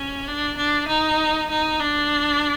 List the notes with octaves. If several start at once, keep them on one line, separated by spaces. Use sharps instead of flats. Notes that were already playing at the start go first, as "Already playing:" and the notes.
Already playing: C#4
D4
D4
D#4
D#4
D4